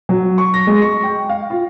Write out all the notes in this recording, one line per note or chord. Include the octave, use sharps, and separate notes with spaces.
F#3
C#6
A#6
G#3
C#6
G5
F5
F4